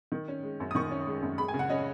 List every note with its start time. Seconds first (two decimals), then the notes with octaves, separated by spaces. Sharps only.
0.12 D#3
0.28 C#4
0.43 G#3
0.60 F#2
0.71 D#6
0.75 D#3 C#6
0.91 C#4
1.07 G#3
1.22 F#2
1.38 G#3 B5
1.48 G#5
1.54 C#3
1.59 F#5
1.69 C#4 D#5